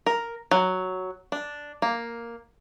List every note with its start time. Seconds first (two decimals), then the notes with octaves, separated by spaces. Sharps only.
0.06 A#4
0.51 F#3
1.32 D4
1.82 A#3